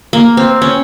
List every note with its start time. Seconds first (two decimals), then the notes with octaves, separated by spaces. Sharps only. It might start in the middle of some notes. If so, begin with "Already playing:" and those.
0.13 A#3
0.37 C4
0.62 C#4